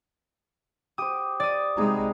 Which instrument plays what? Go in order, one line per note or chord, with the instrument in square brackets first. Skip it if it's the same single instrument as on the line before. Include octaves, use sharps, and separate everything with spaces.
[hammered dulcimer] G4 C5 [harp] D#6
[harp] D5 D#6
[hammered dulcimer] C3 G3 G#4 [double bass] G#3 D#4